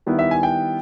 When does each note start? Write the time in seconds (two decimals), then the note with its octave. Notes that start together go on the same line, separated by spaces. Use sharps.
0.06 D#3 G3 B3 E4
0.19 E5
0.31 G#5
0.43 G5